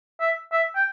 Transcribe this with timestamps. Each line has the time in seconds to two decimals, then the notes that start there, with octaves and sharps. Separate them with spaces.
0.21 E5
0.52 E5
0.76 G5